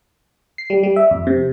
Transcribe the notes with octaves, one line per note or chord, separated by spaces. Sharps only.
C7
G3
G3
E5
F2
C3